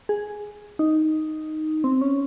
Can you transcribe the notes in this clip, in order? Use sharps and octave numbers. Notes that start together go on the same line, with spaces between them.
G#4
D#4
C4
C#4